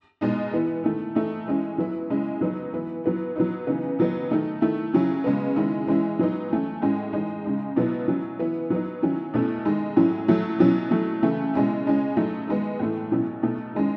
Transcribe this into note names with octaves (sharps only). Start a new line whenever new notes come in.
B2 G#3 D#4
E3 B3 E4
D#3 A3 E4
E3 A3 D#4
E3 G#3 C#4 E4
F#3 B3 E4
C#3 G#3 C#4 E4
F#3 B3 D#4
E3 B3 E4
F#3 B3 E4
F#3 B3 D#4
C#3 E3 B3 D#4
D#3 F#3 B3 D#4
D#3 A3 D#4
D#3 A3 E4
C#3 F#3 C#4 E4
C#3 G#3 B3
D#3 G#3 C#4 E4
E3 G#3 C#4 E4
F#3 B3 D#4
E3 A3 C#4
A2 G#3 C#4
E3 G#3 D#4
C#3 G#3 D#4
B2 F#3 B3 E4
F#3 C#4 E4
E3 B3 E4
F#3 B3 D#4
D#3 F#3 C#4 E4
B2 A3 C#4 E4
D#3 G#3 D#4
A2 F#3 C#4 E4
F#3 A3 E4
B2 F#3 C#4 E4
F#3 A3 E4
C#3 E3 A3 E4
B2 G#3 C#4 E4
C#3 G#3 C#4
F#3 A3 D#4
D#3 G#3 B3
A2 E3 A3
B2 F#3 C#4 E4
B2 A3 D#4
D#3 G#3 C#4